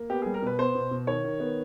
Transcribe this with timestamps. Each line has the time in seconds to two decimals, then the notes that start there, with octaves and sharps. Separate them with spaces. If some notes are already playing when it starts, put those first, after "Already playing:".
Already playing: A#3
0.10 B3 G4
0.22 G#4
0.26 G3
0.34 A#4
0.42 B2 B4
0.59 B3 C5
0.75 B2
0.91 B2
1.07 D#3 C#5
1.24 D#3
1.40 B3